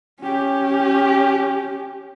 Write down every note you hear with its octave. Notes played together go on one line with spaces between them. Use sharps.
C#4 G4